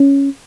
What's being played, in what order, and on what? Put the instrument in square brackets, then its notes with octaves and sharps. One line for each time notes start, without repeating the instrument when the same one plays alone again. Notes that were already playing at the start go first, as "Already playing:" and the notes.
Already playing: [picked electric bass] C#4